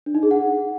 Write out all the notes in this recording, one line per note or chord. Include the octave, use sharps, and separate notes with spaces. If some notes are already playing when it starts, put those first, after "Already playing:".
D4
D#4
G#4
F#5